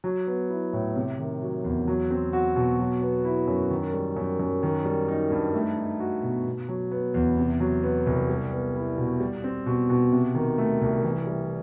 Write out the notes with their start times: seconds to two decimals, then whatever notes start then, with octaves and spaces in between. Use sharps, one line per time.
0.04 F#3
0.27 B3
0.50 E4
0.73 A2
0.96 C3
1.19 D#3
1.42 F#3
1.64 E2
1.88 F#3
2.11 C4
2.33 F#4
2.56 B2
2.79 F#3
3.02 B3
3.25 E4
3.48 F#2
3.71 D#3
3.94 G3
4.16 F#2
4.39 F#2
4.63 D#3
4.85 G3
5.08 D#4
5.31 G2
5.54 A3
5.77 D#4
6.00 F#4
6.23 B2
6.46 B2
6.69 F#3
6.92 B3
7.14 E2
7.37 C3
7.60 F#3
7.83 B3
8.07 C2
8.29 G3
8.52 B3
8.75 E4
8.98 B2
9.20 G3
9.44 C4
9.66 B2
9.90 B2
10.12 C3
10.35 D#3
10.58 A3
10.81 C2
11.04 E3
11.27 G3